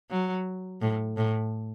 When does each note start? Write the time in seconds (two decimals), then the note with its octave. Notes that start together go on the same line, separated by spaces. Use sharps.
0.11 F#3
0.82 A2
1.17 A2